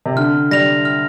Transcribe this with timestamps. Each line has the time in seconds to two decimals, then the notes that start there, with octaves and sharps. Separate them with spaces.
0.06 C3
0.16 D3 F6
0.51 G3 A#6 F7
0.85 F6